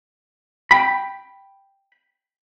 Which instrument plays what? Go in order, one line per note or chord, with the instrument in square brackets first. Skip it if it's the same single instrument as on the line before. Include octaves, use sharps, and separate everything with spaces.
[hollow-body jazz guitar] G5 B5